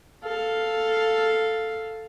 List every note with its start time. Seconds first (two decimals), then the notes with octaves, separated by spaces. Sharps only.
0.23 A4 F5